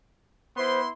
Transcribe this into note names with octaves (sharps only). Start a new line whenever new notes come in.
B3 E4 C5 C6